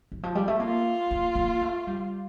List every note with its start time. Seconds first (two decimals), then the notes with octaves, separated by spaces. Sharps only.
0.12 D#3
0.23 F3
0.35 G3
0.48 A3
0.59 A#3 F4
1.11 A#3
1.35 A#3
1.62 A3
1.87 G3